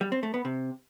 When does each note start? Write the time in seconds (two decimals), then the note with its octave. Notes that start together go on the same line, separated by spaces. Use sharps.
0.01 G3
0.12 C4
0.23 A3
0.34 B3
0.45 C3